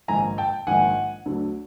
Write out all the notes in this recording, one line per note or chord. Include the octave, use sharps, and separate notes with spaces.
A#1 G#2 D#3 G#5 A#5
G5 A5
A#1 G#2 D#3 F#5 G#5
D2 D3 F#3